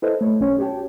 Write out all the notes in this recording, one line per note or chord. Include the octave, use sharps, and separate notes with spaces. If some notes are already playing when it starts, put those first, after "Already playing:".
E4 A4 B4 C5 D#5
A3 C#5
B1 C#4 C#5
F#4 G4 C#5 G5 A5